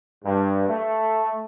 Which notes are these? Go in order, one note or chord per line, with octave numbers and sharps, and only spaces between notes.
G2
A3